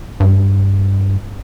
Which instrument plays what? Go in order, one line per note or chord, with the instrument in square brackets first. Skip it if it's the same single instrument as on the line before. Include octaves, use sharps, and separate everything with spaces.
[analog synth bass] G2